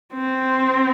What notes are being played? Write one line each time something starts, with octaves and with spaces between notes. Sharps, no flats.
C4